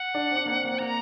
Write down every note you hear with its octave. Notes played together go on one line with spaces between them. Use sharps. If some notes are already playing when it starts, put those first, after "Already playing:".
Already playing: F#5
D4
C4
D4
A#3
C4
A#3
C4
A#3 A#5